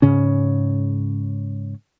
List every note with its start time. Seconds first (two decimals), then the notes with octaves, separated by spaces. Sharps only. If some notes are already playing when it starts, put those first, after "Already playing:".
0.02 G#2 C#3 C#4